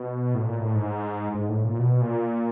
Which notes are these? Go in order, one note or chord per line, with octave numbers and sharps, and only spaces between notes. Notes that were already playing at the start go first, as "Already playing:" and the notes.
Already playing: B2
A2
A#2
A2
G#2
G#2
A2
A#2
B2
A#2